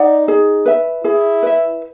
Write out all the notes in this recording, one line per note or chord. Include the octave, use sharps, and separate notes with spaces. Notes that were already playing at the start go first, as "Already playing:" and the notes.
Already playing: D#4 D5 F#5
G#4
B4 E5
E4 G#4
B4 E5